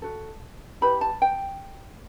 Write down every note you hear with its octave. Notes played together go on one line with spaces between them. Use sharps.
F#4 A4
E4 G4 B4 B5
A5
G5